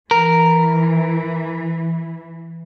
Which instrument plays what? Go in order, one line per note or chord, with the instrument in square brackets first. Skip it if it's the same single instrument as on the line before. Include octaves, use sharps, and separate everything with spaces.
[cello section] E3 [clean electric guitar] A#4